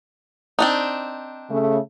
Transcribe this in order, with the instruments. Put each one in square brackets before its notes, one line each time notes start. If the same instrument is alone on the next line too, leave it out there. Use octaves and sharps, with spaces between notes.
[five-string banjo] C4 D4 D#4
[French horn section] C#3 A3